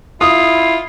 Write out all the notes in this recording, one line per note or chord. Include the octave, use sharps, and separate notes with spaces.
E4 F4 D#6